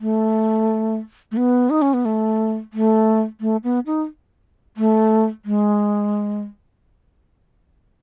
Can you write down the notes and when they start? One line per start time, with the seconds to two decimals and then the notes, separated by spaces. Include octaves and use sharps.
0.01 A3
1.32 A3
1.37 B3
1.70 D#4
1.82 C#4
1.94 B3
2.05 A3
2.73 A3
3.41 A3
3.64 B3
3.86 D#4
4.77 A3
5.45 G#3